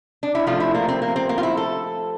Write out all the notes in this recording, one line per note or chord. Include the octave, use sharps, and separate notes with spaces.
D4
E4
C3 F3 A3 F4
E4
A#3
C4
A#3
C4
A#3
F4
E4
A4